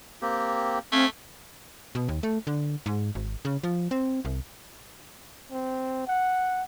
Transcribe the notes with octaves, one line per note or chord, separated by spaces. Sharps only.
A#3 C4 G4
A3 C4 F5 G#5
B2
D#2
A3
D3
G#2
G#1
C#3
F3
C4
C2
C4
F#5